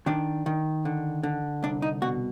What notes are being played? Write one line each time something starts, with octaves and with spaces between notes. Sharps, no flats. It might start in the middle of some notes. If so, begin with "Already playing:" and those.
D#3 D4
D#3
D3
D3
C2 D4
D#4
B2 F#4